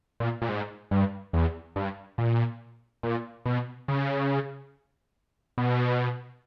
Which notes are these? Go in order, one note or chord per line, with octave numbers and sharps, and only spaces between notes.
A#2
A#2
G#2
G2
E2
G2
A#2
A#2
B2
C#3
B2